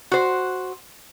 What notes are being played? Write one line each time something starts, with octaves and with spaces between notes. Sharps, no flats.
F#4 C5